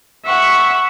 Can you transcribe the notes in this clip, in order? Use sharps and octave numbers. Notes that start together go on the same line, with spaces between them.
E5 F#5 C#6